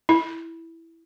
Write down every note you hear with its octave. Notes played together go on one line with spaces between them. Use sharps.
E4